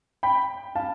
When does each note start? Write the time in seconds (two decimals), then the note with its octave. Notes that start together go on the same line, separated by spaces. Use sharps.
0.23 G5 B5
0.75 F5 A5